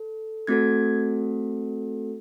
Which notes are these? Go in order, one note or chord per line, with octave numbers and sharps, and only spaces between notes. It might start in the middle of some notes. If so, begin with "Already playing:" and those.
Already playing: A4
A3 C4 F#4 A4 G#6